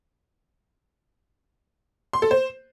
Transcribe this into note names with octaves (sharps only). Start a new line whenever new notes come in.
C6
A4
C5